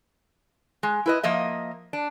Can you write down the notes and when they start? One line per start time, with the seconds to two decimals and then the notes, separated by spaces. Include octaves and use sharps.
0.83 G#3
1.06 E4 B4 D#5
1.23 F3 A#3 D#5 E5
1.93 D4